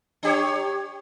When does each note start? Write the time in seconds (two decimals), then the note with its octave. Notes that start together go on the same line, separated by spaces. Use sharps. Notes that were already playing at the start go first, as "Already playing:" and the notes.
0.23 D4 G4 C#5